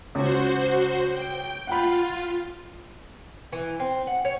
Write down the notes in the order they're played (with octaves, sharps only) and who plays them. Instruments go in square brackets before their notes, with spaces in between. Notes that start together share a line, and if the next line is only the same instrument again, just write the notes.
[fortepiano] C#2 C#4 [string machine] F#4 C5
[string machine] G5
[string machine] F4 [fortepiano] F#5 G5 B5
[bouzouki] E3
C4
F#5
C#5